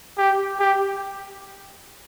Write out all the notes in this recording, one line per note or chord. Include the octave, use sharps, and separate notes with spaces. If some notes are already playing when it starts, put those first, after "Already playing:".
G4
G4